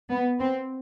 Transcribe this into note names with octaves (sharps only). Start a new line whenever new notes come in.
B3
C4